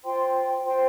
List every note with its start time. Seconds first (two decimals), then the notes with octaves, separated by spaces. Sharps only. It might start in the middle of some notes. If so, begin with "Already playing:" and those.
0.03 F4 C5 G5 C6
0.63 F4 C5 G5 C6